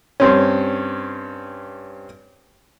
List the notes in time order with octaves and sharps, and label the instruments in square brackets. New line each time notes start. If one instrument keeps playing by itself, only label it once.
[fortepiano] G2 C4 C#4